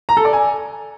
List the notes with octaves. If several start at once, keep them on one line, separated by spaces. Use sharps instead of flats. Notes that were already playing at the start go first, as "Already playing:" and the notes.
A#5
A4
D5
G#5